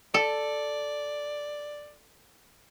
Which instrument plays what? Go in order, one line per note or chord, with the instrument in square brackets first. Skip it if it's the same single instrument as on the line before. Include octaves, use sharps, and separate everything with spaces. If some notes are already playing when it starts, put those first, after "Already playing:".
[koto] A4 [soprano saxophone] D5